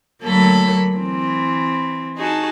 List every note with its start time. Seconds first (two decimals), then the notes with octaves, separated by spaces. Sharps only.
0.22 D2 F#3 A#3 A4 B5
0.95 E3 C4
2.17 D#4 F#4 G#4 A5